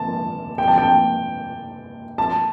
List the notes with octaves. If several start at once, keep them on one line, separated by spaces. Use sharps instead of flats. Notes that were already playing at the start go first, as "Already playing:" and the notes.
Already playing: A5
G5
A5
G5
A5